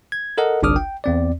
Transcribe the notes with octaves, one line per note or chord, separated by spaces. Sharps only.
G#6
A4 A#4 D#5 F#5
G1 C2 D4 D6 D#6 F6
G5
E2 C4 D5